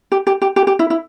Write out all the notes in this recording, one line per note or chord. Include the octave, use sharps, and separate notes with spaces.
G4
G4
G4
G4
G4
E4
E4